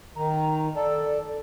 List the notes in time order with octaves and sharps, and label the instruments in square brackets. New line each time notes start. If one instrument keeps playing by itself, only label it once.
[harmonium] D#3 [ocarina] A#5
[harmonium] A4 [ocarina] D5